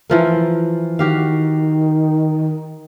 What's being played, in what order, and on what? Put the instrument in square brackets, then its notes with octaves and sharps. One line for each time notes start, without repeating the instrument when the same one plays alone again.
[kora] E3 F3 A#4
[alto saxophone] D#3 [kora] F#4 G4 F5